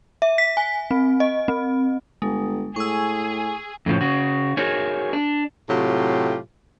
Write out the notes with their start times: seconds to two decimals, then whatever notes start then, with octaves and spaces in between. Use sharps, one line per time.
0.22 E5
0.38 B6
0.57 G#5
0.91 C4
1.20 D#5
1.48 C4
2.22 G1 G#3
2.76 A2 G#4 C#6 E6
3.86 F2 A2 C#3 F3
4.01 C#3 F#4
4.57 D#4 F#4 G#4 A#4 C#5
5.13 D4
5.69 A2 C3 F#3 F4 G4